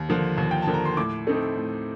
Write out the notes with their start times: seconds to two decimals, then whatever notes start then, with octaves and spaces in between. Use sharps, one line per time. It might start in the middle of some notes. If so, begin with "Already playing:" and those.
Already playing: D#2
0.09 D3 F3 A#3
0.38 D#2
0.51 G5
0.62 A5
0.67 D3 F3 A#3
0.74 A#5
0.85 C6
0.97 A2 D6
1.27 A3 C4 D#4
1.56 A2